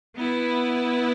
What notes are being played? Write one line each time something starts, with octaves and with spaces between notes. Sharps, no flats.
B3 E4 B4